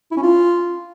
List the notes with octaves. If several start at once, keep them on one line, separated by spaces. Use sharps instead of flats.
E4
C#4
F4